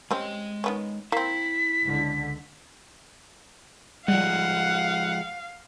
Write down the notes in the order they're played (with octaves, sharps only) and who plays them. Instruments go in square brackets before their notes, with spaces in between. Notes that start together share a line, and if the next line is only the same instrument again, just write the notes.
[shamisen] G3 C4 C#4 [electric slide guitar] G#3 D#5
[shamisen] D#3 B3 C#4
[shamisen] A#3 C4 [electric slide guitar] E4 [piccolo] B6
[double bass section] C#2 D3
[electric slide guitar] F3 G#3 [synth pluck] G3 [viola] F5 [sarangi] F#5